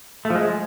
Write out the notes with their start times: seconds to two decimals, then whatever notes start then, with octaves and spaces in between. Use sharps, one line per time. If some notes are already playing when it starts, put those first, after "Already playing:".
0.25 A3
0.30 F3
0.35 G#3